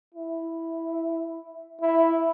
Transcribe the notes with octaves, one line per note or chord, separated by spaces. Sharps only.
E4
E4